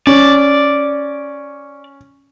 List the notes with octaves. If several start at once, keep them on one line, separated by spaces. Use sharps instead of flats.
C#4 D5